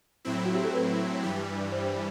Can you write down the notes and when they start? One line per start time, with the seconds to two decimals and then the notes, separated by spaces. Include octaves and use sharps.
0.25 A2 F#3 C4 E4
0.45 F#4
0.55 G4
0.64 A4
0.74 B4
1.23 G2 E3 G3
1.72 C5